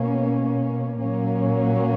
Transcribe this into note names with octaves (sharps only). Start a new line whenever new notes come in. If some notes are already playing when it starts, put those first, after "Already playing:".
Already playing: B2 A#3 C#4
A#2 F#3 A#3 C#4